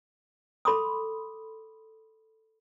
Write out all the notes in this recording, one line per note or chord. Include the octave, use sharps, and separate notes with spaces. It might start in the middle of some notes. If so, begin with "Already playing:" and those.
A4 B5 C6 D6 D#6